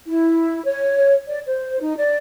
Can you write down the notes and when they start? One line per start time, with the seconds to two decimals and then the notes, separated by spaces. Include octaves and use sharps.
0.07 E4
0.65 C#5
1.27 D5
1.46 C5
1.81 D#4
1.96 D5